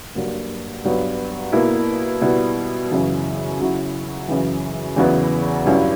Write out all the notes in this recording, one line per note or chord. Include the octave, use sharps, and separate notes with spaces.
G2 F#3 A#3
G2 F#3 B3
B2 A#3 E4
B2 G3 B3 E4
F#2 C#3 E3
C#3 F#3 C#4 E4
F#2 C#3 E3
E2 C#3 F#3 B3 E4
G2 F#3 C#4 E4